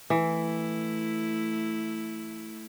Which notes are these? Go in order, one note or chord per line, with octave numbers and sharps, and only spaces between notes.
E3 A3 E4